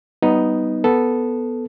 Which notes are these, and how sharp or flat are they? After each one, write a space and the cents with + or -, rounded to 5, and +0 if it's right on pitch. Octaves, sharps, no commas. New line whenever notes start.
G3 -35 B3 +0 D#4 +0
B3 +0 A4 -5